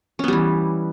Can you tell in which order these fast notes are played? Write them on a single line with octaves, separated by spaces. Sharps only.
C#4 B3 G3 E3